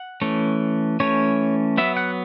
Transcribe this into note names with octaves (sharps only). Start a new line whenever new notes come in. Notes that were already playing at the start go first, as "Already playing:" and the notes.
Already playing: F#5
E3 A3 C#4
E3 A3 C#4 C#5
F#3 B3 E5
F#5